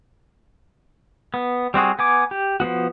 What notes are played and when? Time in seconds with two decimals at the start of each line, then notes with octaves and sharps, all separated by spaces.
1.34 B3
1.74 G3 C4 F#4 G#4
1.99 B3 G#5 D6
2.31 G4
2.60 F3 A3 B3 F#4